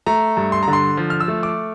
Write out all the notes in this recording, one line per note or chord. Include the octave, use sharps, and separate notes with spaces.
A3 A#5
G2
C6
D3 A#5
C6
F3
F6
E6
A3
D6